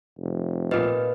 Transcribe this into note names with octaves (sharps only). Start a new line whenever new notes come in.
F1
A#2 B4 D#5 F5